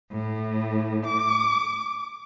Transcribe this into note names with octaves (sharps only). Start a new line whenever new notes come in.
A2
D6